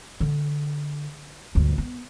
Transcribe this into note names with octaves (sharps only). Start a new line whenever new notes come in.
D3
D2 G2
B3